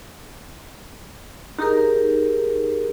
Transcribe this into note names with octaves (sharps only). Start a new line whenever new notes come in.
D#4 G4 G#4 A#4